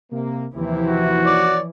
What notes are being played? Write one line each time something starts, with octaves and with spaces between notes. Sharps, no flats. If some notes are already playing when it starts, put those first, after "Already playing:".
C3 A#3
D#2 C3 E3 F3 E4
F#4
C#5 D5 D6